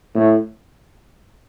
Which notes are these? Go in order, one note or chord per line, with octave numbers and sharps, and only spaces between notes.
A2